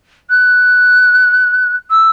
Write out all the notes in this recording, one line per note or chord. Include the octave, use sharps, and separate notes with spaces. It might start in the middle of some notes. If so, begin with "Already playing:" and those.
F#6
E6